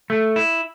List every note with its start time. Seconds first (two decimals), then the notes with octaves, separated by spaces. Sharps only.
0.10 A3
0.36 E4